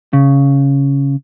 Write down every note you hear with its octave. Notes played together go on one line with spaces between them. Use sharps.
C#3